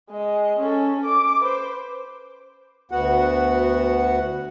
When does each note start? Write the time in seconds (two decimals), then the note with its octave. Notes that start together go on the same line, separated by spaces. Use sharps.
0.10 G#3 D#5
0.59 C#4 A4
1.05 D6
1.41 B4 C5
2.91 D2 B3 F#4 F#5